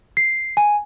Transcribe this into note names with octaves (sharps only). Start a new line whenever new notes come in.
C7
G#5